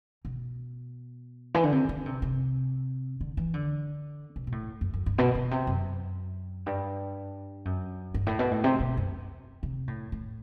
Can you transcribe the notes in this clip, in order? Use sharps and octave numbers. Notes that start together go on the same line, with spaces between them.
B2
E3
D3
C3
D3
C3
C3
D3
E3
D3
B2
B2
A2
F#2
F#2
G2
B2
B2
C3
F#2
G2
F#2
G2
A2
B2
A2
C3
B2
F#2
C3
A2
A2